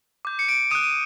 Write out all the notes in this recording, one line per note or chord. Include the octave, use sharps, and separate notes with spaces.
D6 G6
C#7
D7
D#6 F#6 D#7
D#7